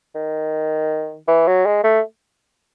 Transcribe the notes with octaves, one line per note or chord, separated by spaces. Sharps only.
D#3
E3
F#3
G#3
A3